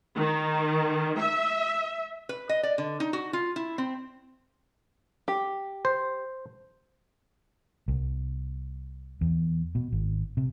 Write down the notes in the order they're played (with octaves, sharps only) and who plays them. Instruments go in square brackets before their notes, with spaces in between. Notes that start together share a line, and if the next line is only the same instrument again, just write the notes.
[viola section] D#3
E5
[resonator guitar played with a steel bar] B4
D#5
D5
D3
D#4
F#4
F4
E4
C4
[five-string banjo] G4
[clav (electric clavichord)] C5
[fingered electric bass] C2
E2
B2
G#1
C3